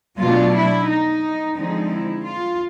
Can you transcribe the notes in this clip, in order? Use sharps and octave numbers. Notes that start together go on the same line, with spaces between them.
B2 F#3 A3 D4 F4
E4
D#4
D3 F3 G#3 C4 D#4
E4
F4